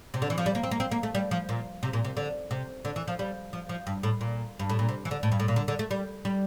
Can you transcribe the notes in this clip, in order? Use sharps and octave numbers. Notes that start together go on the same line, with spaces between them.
C3
D3
E3
F3
G3
A#3
C4
A#3
C4
A#3
A3
G3
F3
A#2
C3
A#2
C3
D3
C3
D3
E3
F3
G3
F3
F3
G2
A2
A#2
G2
A2
A#2
C3
E3
D3
A2
G2
A2
A#2
D3
D3
A3
G3
G3